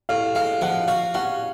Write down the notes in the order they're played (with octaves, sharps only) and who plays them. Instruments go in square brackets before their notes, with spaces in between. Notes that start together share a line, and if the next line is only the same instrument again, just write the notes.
[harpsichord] A2 [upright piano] F5
[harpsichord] G#3 [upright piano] F5
[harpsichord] F3 [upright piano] F#5
[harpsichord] F#4 [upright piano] F5
[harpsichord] C#4 [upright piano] F#5